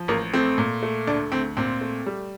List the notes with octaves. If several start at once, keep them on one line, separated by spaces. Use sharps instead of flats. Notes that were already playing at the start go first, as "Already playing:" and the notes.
Already playing: F3
A1 A#3
A3 C4
A#2
A3
D2 D4
D2 C4
A#2 C4
A3
G3